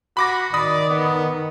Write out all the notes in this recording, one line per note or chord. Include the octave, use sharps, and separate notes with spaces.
F#4 B5 D6 A#6
D#3 D5 B5 D#6
B3